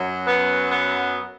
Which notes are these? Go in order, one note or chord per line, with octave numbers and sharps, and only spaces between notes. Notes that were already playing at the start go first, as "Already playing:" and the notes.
Already playing: F#2 F#3
B3
B3